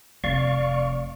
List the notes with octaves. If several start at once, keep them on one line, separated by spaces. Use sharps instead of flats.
F1 D5 F5 C#6